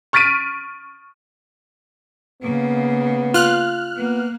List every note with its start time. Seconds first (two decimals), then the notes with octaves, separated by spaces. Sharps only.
0.13 C#6 F6 A6 B6 D7 D#7
2.42 C#3 A#3 B3
3.34 F4 F6 F#6
3.97 A#3 B3